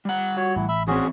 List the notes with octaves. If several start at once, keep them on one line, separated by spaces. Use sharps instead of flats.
G3 F#5
F#4 C#5
A1 E4
E5 B5
E3 C4 C#4 F#4 G#4